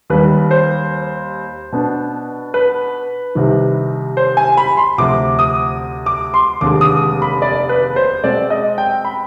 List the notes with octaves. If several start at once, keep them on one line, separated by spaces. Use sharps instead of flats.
D#2 D#3 G3 B4
C5
B2 B3 D4
B4
C2 C3 D#3
C5
G#5
B5
C6
D2 C3 F3 D6
D#6
D6
C6
F1 D#2 D3 G#3 D6
D#6
B5
D5
B4
C5
B2 G#3 C4 D5
D#5
G5
B5